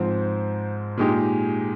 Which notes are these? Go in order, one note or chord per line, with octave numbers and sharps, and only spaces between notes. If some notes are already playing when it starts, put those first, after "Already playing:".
Already playing: G#2 F3 C4
A#2 G#3 D#4 G4